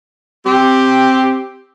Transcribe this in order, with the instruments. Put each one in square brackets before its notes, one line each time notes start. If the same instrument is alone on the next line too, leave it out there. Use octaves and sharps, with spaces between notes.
[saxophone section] C4 G4